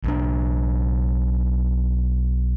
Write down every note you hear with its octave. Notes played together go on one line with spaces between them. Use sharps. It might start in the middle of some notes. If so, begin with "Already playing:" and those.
B1 D4